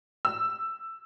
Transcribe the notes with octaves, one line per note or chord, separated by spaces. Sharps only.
E6